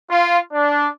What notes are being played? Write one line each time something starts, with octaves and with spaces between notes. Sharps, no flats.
F4
D4